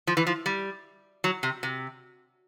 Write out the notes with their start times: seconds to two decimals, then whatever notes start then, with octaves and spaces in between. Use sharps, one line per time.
0.07 F3
0.17 E3
0.27 F3
0.46 G3
1.24 F#3
1.43 C3
1.63 C3